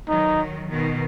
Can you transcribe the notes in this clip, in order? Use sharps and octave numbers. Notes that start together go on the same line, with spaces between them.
D#3 F#3 D#4
B2 D#3